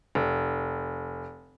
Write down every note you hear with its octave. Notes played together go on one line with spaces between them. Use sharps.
F1